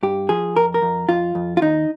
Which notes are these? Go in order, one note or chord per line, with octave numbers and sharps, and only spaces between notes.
G2 G4
F3 G#4
F2 A#4
A#4
F2
F2 F4
F2
F4
D#2 D#4